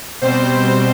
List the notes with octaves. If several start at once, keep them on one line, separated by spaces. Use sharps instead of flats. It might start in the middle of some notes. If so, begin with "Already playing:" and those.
B2 G3 C4 C5
C5